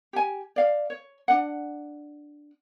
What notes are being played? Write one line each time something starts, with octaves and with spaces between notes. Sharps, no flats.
G4 G#5
D5 F5
C#5
D4 F#5